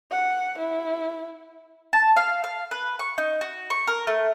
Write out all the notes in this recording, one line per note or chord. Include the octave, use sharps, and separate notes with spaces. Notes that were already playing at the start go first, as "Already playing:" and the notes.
F#5
E4
A5
F5
F5
B4
C#6
D#4
F#4
C#6
A#4
A3